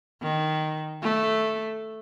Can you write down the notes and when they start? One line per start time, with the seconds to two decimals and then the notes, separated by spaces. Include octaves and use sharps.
0.22 D#3
1.02 A3